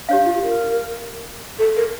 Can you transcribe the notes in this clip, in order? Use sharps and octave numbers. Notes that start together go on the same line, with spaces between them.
D4 G4 C#5 F5
F4
A#4
A4
A#4